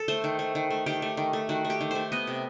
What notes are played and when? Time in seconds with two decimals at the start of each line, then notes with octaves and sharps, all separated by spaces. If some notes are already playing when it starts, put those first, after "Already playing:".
Already playing: A4
0.08 A3 C5
0.24 D#3
0.39 A3
0.55 D#3
0.70 A3
0.86 D#3 G4
1.02 A3
1.17 D#3
1.33 A3
1.49 D#3 F#4
1.65 A3
1.70 G4
1.81 D#3
1.91 A3 C5
2.12 B3 D#5
2.27 C3